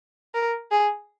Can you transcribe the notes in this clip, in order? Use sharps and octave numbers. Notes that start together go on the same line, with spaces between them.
A#4
G#4